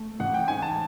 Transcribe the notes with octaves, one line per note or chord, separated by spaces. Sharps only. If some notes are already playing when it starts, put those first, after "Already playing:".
Already playing: A3
A1 F#5
G5
G#2 G#5
A5